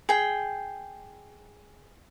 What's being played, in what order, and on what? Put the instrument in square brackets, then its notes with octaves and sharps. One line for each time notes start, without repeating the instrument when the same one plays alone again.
[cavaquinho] G#4 G5